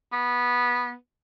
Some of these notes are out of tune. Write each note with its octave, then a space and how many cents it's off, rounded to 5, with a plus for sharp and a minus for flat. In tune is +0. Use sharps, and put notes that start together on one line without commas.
B3 -15